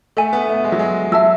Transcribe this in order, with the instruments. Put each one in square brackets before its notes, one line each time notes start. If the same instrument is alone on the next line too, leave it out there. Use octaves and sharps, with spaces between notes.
[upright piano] A3 [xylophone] A4 E5 G#5
[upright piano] B3
A3
G#3
F#3
G#3
[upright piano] F#3 [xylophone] E5 A5 E6